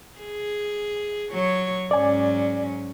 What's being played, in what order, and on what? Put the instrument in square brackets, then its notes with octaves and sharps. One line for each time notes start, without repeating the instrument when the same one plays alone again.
[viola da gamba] G#4
F#3 C#5
[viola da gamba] G#2 F#3 C#4 [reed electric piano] D5 G#5